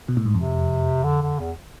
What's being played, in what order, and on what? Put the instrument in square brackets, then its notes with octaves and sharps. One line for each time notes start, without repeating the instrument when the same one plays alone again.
[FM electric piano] B2
A2
G#2
[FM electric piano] F2 [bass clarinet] C3
[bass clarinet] D3
D3
E2